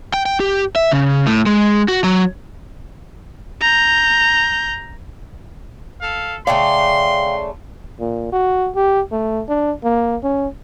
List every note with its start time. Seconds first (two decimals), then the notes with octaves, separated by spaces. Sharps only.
0.14 G5
0.26 G5
0.40 G4
0.76 E5
0.92 C#3
1.27 A2
1.46 G#3
1.88 F#4
2.04 F#3
3.61 A#5 G6
6.02 A4 F5
6.47 C#3 A3 D5 F5 G5 C6
8.00 A#2
8.32 F#4
8.75 G4
9.12 A3
9.49 D4
9.84 A#3
10.23 C#4